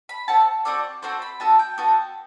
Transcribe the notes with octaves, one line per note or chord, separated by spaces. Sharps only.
B5
C4 F#4 A4 A5
C4 F#4 A4 D5
C4 F#4 A4 C5
B5
B3 F#4 A4 A5
G5
B3 F#4 A4